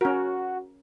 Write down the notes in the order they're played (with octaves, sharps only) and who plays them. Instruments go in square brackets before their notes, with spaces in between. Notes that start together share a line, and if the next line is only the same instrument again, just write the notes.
[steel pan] C#4 A#4 [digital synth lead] F#4